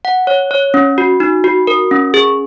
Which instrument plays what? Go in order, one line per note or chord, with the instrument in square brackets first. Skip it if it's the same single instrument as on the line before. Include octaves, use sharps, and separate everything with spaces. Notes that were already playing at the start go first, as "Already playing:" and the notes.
[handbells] F#5
C#5
C#5
C#4
F#4
D#4
F#4
A#4
C#4
G#4